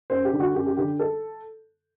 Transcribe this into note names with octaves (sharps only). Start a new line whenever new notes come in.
F#2 C5
G4
D3
F#4
F#2 G4
G4
D3 G4
A4